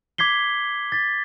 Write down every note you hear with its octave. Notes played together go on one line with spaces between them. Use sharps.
D6 G#6 B6 C7 G7
A6 B6